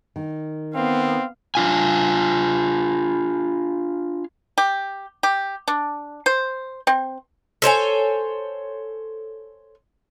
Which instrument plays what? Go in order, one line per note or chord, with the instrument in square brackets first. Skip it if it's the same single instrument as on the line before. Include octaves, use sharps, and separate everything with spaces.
[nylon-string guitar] D#3
[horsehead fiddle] B3 F5 [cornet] C4
[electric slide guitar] D4 F4 G#5
[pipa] G4
G4
D4
C5
C4
[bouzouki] A4 C5 C#5 G#5